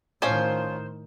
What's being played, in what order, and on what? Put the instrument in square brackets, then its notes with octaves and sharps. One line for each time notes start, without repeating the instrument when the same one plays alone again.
[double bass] A2 D#3 [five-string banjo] F3 C#4 F5 [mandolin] C5